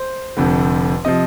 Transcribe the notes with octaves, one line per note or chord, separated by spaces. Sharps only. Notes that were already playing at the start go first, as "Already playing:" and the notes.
Already playing: C5
F1 F2 D3
C3 F3 D#5